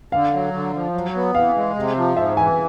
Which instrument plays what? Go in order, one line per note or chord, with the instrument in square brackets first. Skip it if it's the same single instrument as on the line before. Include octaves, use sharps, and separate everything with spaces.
[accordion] D3 [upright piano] F5
[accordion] F#3
D3
F3
F#3
B3
[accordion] E3 [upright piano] F5
[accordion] G#3
C3
F3
[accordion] G#2 [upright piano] E5
[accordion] E3 [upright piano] G#5